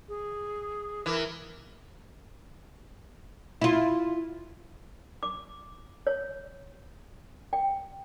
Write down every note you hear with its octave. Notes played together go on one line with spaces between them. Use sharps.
G#4
E3 A#4
E4 F4
D6
C#5
G5